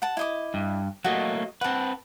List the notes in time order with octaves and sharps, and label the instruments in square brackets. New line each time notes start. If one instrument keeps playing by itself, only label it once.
[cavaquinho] F#5 A5
E4 D#5 D6
[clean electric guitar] G2
[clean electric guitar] F#3 A3 A#3 [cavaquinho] F#4 D#5
[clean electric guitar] C4 B4 [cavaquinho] F#5 A5